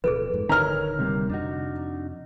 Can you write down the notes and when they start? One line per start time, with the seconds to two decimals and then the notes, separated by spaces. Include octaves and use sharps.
0.04 D1 B2 F3 G#4 A4 B4
0.33 F2 G#2
0.49 D1 D3 D#3 D#4 A#4 C#5 A#5 F6
0.99 C3 G3 A#3
1.30 F2 C3 D4 D#4 F#4